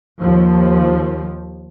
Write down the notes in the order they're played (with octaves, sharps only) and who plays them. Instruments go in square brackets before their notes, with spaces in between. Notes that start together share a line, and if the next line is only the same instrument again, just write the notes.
[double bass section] D#2 F3